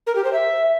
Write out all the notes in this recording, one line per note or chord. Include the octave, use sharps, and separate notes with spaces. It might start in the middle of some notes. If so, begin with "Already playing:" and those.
A#4
G4
C5
E5